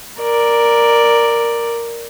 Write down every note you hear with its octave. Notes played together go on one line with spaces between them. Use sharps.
A#4 D5